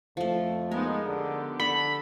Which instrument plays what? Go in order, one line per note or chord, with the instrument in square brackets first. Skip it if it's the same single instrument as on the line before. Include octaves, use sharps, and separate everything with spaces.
[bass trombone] F2 [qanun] F3 A3
[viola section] G#3 B3 D#4 [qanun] A#4
[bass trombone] D3 [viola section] B3 G4
[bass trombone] D3 [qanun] A4 [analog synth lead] B5